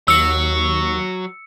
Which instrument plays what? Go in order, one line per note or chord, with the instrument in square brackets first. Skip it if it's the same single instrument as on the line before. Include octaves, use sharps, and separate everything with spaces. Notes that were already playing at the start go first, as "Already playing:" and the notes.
[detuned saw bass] D#2 [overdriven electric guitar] F#3 [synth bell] E6 C#7